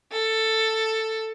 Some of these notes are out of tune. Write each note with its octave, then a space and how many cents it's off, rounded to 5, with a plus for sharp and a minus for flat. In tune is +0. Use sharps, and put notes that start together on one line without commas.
A4 +10